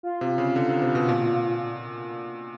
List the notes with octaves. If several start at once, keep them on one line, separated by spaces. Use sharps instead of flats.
F4
C3
C#3
D3
C3
C3
B2
A#2